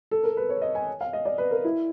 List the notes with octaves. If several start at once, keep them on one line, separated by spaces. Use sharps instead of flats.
A4
A#4
B4
C#5
D#5
G#5
F5
D#5
D5
B4
A#4
E4